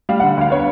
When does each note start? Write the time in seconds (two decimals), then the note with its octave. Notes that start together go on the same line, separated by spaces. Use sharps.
0.09 G3 F5
0.20 F#5
0.23 D3
0.37 D2 F5
0.51 B3 C#5